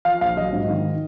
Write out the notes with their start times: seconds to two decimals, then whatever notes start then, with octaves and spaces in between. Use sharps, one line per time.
0.05 F3 F5
0.21 A#1 F5
0.37 F#3 D#5
0.53 G#2
0.69 D#3